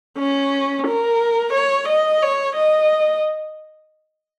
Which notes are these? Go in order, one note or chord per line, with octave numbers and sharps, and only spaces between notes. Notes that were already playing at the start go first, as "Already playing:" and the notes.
C#4
A#4
C#5
D#5
C#5
D#5